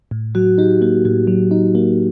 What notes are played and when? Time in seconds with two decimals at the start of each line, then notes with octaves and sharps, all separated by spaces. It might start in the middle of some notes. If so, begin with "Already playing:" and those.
0.11 A2
0.35 F#3 F#4
0.58 D#4 G4
0.81 A#3 F#4
1.05 A2 F#4
1.27 F#3
1.51 D#4
1.75 A#3